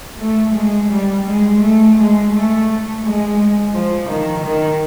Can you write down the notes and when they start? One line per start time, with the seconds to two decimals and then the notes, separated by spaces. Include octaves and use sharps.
0.19 A3
0.54 G#3
0.90 G3
1.26 G#3
1.61 A3
1.96 G#3
2.31 A3
3.03 G#3
3.73 F3
4.08 D#3
4.44 D#3